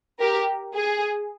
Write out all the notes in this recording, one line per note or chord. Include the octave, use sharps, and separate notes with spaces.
G4 A#4
G#4